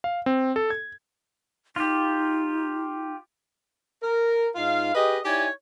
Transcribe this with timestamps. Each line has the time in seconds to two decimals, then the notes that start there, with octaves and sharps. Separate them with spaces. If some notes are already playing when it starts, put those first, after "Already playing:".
0.04 F5
0.26 C4
0.56 A4
0.70 G#6
1.76 D#4 F4 G4
4.02 A#4
4.56 G#2 D#4 F4 F5
4.95 G4 G#4 B4 D#5
5.25 D#4 E4 G4 C#5 D5 G#5